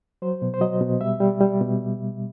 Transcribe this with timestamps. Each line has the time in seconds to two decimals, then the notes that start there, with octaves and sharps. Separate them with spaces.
0.22 F#3 C5
0.42 B2
0.54 C5
0.61 F#3 D#5
0.81 B2
1.01 G3 E5
1.20 G3
1.40 G3
1.61 B2